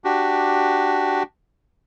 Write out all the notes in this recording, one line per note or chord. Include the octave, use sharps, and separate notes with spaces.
D4 F#4 G4